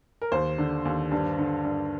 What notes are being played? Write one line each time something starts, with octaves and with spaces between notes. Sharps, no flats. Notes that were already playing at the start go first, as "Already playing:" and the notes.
A#4
D#2 C5
D3
D#2
G2
D3
G2